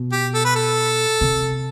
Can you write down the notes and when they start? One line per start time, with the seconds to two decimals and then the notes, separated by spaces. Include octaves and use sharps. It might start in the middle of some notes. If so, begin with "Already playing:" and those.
Already playing: B2
0.12 G4
0.34 A4
0.45 B4
0.56 A4
1.21 C3